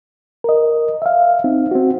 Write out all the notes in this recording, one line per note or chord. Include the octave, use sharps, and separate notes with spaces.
A#4 D#5
E5 F5
C4 D#4
C4 F#4